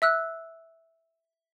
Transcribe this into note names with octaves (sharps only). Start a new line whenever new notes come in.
E5 E6 F#6